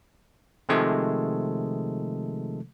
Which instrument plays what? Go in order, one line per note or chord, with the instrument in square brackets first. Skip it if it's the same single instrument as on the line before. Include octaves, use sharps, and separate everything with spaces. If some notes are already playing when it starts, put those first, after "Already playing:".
[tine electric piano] C3 D#3 F3 G#3 A3 A4